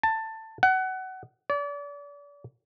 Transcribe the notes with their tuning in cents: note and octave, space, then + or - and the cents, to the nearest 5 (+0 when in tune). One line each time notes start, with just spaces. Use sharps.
A5 +15
F#5 +25
D5 -35